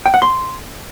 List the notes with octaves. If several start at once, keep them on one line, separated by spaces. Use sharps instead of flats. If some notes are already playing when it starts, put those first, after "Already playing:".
G5
F#5
C6